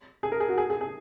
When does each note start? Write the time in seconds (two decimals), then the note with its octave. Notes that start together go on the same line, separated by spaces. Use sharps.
0.23 G#4
0.32 A#4
0.40 G#4
0.49 F#4
0.57 G#4
0.70 G#4
0.81 G#4